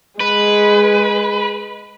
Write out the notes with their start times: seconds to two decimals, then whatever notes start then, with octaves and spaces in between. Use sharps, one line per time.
0.20 G#3 B4